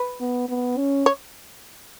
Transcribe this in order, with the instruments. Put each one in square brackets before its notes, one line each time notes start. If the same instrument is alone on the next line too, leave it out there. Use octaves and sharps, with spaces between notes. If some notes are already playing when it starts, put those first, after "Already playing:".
Already playing: [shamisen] B4
[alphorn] B3
B3
C#4
[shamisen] C#5